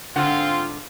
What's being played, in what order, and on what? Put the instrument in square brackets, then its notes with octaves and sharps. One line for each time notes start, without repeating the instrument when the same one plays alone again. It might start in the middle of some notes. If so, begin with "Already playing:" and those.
[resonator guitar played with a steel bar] G#2 D3 F#5 [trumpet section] C4 F4